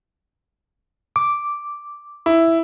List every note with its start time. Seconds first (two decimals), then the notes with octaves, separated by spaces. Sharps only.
1.16 D6
2.26 E4